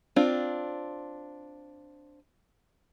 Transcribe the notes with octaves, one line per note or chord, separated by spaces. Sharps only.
C4 D4 F4